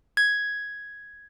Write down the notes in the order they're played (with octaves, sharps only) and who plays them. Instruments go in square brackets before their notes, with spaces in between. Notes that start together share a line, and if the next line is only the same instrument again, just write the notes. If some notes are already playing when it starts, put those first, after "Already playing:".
[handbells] G#6